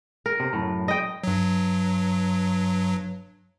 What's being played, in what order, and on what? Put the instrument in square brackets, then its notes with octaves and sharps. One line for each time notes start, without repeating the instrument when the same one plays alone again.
[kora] A#4
[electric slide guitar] C3
F#2 A2
[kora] D#5 G5
[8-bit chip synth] G2 F#3